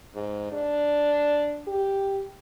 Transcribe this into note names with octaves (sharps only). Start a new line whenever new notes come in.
G#2
D4
G4